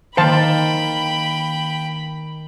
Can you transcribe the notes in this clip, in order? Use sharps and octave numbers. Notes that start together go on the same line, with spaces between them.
D#3 A#3 C5 F5 G5 A5 B5